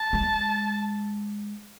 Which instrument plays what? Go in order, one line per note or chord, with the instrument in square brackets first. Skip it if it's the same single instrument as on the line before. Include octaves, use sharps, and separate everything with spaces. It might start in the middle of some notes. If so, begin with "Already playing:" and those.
Already playing: [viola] A5
[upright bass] G#3